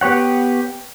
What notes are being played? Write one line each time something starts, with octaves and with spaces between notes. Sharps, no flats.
B3 G4 C#5 F#5